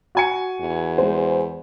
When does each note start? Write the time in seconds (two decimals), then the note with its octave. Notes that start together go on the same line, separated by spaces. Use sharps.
0.15 F#4 G#5 C#7
0.60 E2
0.98 G#3 C5